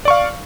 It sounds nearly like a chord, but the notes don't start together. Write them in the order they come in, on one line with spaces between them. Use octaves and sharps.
D5 C#6 F5